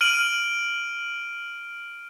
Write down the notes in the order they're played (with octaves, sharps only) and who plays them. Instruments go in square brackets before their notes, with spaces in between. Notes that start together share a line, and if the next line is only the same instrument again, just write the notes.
[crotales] F6 D7 D#7 F#7